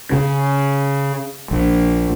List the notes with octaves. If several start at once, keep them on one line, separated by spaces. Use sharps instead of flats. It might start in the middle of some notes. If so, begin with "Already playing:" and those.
C#3
A#1